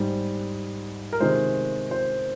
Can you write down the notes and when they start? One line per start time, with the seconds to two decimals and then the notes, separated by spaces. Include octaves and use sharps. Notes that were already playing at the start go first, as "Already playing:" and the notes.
Already playing: G#2 G3 C5
1.13 A#4
1.20 C3 D#3 G#3 C5
1.91 C5